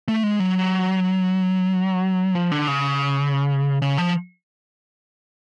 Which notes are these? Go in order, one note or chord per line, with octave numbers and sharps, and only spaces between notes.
A3
G#3
F#3
F3
D3
C#3
C#3
F3